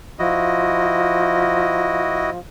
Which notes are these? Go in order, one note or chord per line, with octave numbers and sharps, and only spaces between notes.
F3 E4 F#4 D#5